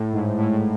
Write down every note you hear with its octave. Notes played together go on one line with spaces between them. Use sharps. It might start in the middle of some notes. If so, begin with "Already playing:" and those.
Already playing: A2
G#2
A2